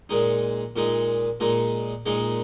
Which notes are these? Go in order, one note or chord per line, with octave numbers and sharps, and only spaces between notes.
A#2 G#3 D#4
A#2 G#3 D#4
A#2 G#3 D#4
A#2 G#3 D#4